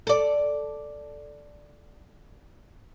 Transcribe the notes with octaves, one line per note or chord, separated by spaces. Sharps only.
A4 D5